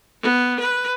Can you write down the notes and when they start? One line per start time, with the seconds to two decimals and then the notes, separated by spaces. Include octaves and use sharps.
0.22 B3
0.60 B4